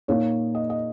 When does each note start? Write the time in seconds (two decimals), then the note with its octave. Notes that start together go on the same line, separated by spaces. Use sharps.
0.08 A#2 A#3 D#4 C#5
0.55 D#5
0.70 D#5